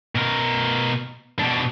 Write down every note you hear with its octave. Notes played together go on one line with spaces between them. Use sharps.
B2 A#4
B2 D4